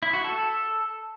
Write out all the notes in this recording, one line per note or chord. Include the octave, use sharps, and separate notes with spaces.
E4
F#4
A4